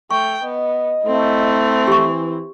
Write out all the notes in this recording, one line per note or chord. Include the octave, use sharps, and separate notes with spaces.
A3 G5 C#6
B3 D#5
A3 C4 E4
E3 G4 C#6